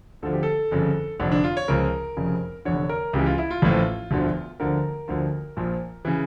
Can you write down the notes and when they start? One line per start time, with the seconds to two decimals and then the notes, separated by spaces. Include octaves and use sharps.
0.22 D2 D3 F3 A4
0.33 G4
0.43 A4
0.71 G1 F2 C#3
1.19 F1 F2 D3 D4
1.32 D4
1.44 F4
1.57 C#5
1.68 C#2 C#3 F3 A#4
2.17 F1 F2 C#3
2.65 F1 E2 D3 C#5
2.89 A#4
3.13 C#2 C#3 E3 G4
3.26 F4
3.38 E4
3.50 F4
3.62 A1 A2 F3
4.11 E1 D2 D3 F3
4.60 D2 D3 F3 A#4
5.08 D2 D3 F3
5.57 A#1 A#2 F3
6.05 C#3 E3